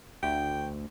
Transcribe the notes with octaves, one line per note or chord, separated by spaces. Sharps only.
D2 G5